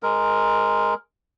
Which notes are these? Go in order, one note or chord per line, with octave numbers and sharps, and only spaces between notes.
G#3 A#4